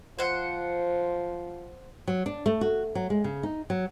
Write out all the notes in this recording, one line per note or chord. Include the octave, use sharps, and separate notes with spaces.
F3 C5 F#5
F#3
D4
A3
F#4
F#3
G#3
C#3
D#4
F#3